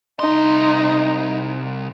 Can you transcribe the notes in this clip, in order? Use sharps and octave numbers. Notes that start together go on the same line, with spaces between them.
C2 D#4 C6